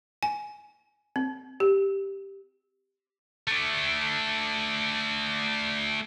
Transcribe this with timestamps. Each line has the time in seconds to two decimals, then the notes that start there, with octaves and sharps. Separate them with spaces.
0.23 G#5
1.16 C4
1.60 G4
3.48 A3 D4